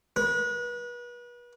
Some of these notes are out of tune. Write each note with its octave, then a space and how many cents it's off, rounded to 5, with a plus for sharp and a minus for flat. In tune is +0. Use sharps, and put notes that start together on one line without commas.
B4 -35